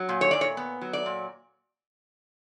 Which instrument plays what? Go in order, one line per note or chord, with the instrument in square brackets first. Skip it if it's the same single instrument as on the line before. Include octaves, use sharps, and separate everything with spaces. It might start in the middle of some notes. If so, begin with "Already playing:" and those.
Already playing: [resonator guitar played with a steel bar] F#3
A#2
C#5
A#2 D5
C#5
B3
F#3
D5
A#2